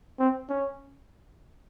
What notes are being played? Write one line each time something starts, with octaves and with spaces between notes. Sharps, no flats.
C4
C#4